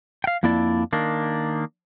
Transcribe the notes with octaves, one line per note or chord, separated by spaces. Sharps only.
F5 G5
F2 A#3 D4 E4 D5
D#3 A#3 D4